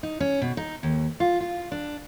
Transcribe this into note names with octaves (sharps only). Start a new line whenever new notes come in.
D#4
C#4
B2
D#4
D#2
F4
F4
D4